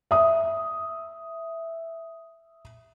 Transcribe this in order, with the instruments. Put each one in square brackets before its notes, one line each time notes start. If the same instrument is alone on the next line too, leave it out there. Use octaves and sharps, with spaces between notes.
[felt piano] E5 D#6